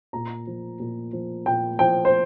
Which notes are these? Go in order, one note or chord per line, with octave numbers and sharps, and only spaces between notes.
A#2 A#5
F3
A#2
F3
A#2 G5
F3 G5
C5